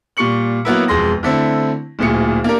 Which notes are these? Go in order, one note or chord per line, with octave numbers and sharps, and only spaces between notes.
A#2 G3 C#6 C#7 F#7
F#3 A#3 B3 E4
E1 F2 G#3 C6 A#6
D3 A3 C4 E4
D1 D2 A#2 G#4 C#7
A#3 D4 G4 A#4